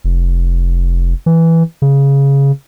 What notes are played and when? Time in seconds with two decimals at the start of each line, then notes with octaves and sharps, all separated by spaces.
0.04 F1
1.26 E3
1.82 C#3